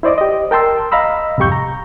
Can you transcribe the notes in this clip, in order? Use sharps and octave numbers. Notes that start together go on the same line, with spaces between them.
E4 C5 D5 D#5 D6
G4 D#5
A#4 G5 A5 C6 E6
D#5 F5 A#5 B5 E6
C2 F2 G#2 G4 C#6 G6
A#5